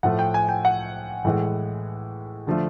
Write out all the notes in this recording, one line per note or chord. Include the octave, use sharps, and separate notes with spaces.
A2 F3 A3 F#5
G5
G#5
G5
F#5
A2 E3 G#3
D3 F3 A3